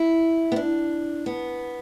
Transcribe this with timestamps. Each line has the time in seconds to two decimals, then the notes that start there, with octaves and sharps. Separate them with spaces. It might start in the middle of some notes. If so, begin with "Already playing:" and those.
Already playing: E4
0.52 B3
0.56 D4
1.26 B3